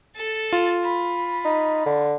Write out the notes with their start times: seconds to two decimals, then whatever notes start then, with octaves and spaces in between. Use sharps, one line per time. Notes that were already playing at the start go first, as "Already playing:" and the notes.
0.16 A4 A6
0.53 F4
0.83 B5
1.45 D#4
1.86 D3